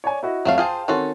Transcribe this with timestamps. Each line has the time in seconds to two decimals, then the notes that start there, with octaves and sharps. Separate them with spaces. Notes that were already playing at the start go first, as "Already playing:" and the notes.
0.04 C#5 D5 G#5
0.23 E4 F#4 D#5
0.45 F2 F#3 A3 F5
0.58 F4 G#4 C5 F5 G5 A5
0.88 D#3 C4 C#4 F#4 A4 C6